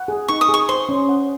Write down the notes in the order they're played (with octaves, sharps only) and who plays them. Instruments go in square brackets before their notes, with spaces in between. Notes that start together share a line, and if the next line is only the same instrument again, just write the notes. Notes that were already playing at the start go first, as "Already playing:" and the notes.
Already playing: [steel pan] F#5
G#4
[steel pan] D#4 [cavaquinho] C#6
[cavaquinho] D#6
[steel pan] G#4
[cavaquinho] C#6
[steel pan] C5 [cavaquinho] C6
[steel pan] C#4
F#5